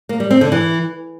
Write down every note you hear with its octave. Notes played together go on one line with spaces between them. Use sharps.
A#3
G3
C4
D3
E3